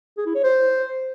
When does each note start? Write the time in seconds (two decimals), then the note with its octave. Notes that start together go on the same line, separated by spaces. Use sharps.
0.18 G#4
0.26 E4
0.35 C#5
0.44 C5